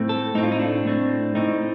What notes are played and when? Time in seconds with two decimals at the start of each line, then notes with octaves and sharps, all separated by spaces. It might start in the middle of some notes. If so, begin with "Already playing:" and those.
Already playing: A2 A3 C4
0.09 A4
0.35 A2 A3 C4 D#4
0.43 F4
0.52 D#4
0.59 D4
0.86 A2 A3 C4
1.35 A2 A3 C4 D#4